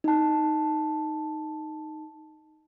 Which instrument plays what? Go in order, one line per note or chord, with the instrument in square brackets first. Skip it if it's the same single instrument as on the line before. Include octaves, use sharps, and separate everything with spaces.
[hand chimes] D#4 A5